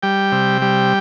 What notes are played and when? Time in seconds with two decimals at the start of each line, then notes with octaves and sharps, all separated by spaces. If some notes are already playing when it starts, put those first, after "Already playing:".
0.03 G3 G5
0.32 C3
0.62 G3